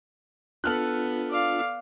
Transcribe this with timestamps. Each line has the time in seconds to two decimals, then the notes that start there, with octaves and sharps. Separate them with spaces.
0.64 B3 D4 F4 A4 F6 F#6
1.30 D5 F5